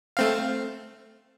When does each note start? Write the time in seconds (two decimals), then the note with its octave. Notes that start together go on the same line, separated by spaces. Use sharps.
0.17 A3 C4 F5